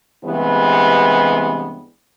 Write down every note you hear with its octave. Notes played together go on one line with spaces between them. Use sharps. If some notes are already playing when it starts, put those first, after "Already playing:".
G2 C3 E3 G#3 B3